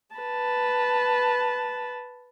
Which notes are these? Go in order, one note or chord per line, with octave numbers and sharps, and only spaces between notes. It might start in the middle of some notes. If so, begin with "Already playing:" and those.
B4 A5